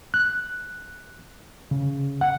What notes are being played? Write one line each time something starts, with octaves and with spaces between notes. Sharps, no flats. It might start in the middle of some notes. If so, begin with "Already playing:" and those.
F#6
C#3
F#5